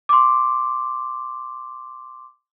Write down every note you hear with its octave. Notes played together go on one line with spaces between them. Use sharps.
C6 D6